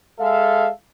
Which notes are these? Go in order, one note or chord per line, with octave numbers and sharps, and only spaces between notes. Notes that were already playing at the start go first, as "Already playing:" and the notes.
G#3 A4 E5 F5